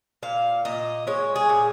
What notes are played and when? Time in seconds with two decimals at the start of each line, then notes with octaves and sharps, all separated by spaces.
0.23 A#2 F5
0.65 A#2 D#5
1.07 G#3 C#5
1.36 G#4
1.49 A#2